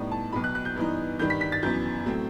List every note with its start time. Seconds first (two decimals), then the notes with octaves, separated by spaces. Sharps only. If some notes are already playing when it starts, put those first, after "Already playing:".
Already playing: A2 G3 B3 D#4
0.11 A5
0.32 B1 B2 F#3 B5
0.44 F#6
0.55 F#6
0.65 G6
0.76 G2 E3 B3 D#4
1.19 G2 D#3 G3 G6
1.30 B6
1.41 B6
1.52 A6
1.63 F#2 E3 B3 G6
2.06 A2 F#3 A3 C4